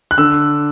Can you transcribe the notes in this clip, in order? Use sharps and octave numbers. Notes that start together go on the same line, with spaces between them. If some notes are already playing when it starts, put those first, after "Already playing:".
F#6
D3 E6